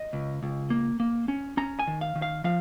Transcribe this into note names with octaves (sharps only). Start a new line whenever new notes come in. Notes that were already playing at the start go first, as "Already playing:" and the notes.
Already playing: D#5
C#2
C#2
A#3
A#3
C#4
C#4 A#5
G#5
D#3
F5
D#3
F5
F3 F5